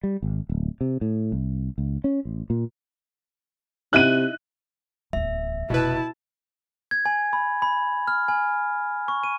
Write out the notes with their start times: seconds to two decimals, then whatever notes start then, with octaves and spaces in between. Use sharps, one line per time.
0.03 G3
0.22 G#1
0.49 D1
0.81 C3
1.01 A2
1.32 C2
1.78 C#2
2.04 C#4
2.25 A1
2.50 A#2
3.93 C3 D#4 E4 F#6 D#7
5.13 D1 E2 E5
5.70 F1 B2 E4 B4 A5
6.91 G#6
7.06 G#5
7.33 B5
7.62 B5
8.08 F6
8.28 G#5
9.08 C#6
9.23 D#7